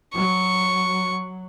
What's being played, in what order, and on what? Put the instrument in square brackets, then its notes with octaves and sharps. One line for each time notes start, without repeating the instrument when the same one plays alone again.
[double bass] F#3 [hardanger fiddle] C#6